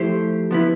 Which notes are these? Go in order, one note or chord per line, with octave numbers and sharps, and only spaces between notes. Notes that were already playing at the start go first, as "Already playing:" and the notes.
Already playing: F3 A3 E4 G4 C5
F3 B3 E4